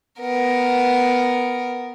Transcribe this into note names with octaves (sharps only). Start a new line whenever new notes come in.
B3 A#4